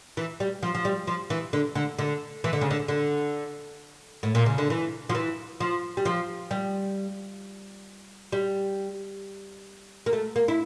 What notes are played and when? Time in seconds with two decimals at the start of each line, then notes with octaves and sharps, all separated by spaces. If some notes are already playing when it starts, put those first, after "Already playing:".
0.17 E3
0.40 G3
0.63 F3
0.75 F3
0.85 G3
1.07 F3
1.30 E3
1.53 D3
1.75 D3
1.99 D3
2.44 E3
2.53 D3
2.61 C#3
2.71 D3
2.88 D3
4.23 A2
4.35 A#2
4.46 C#3
4.58 D3
4.70 E3
5.09 F3
5.15 E3
5.60 F3
5.97 G3
6.05 F3
6.51 G3
8.32 G3
10.06 A#3
10.13 A3
10.36 A#3
10.48 E4